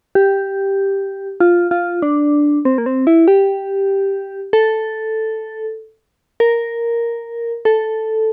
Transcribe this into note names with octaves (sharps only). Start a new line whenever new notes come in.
G4
F4
F4
D4
C4
A#3
C4
E4
G4
A4
A#4
A4